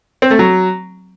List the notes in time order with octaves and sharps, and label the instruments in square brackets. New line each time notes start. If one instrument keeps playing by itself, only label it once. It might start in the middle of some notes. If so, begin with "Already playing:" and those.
[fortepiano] C4
A3
F#3